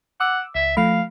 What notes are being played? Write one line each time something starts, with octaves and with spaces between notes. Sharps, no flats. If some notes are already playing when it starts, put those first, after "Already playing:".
F#5 D6 E6
C#2 E5
F3 A3 F5 B5